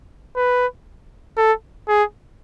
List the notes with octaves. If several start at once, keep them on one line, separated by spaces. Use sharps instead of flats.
B4
A4
G#4